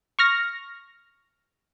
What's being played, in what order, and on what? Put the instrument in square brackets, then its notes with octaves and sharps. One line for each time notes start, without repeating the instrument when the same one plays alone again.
[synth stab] C#6 F6 A#6